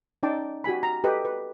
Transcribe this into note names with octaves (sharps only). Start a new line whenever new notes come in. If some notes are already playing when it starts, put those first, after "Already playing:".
C#4 D#4 D5 G5 A5 D6
F#4 G4 G#5 B5
A#5
G4 A4 B4 D#5
B4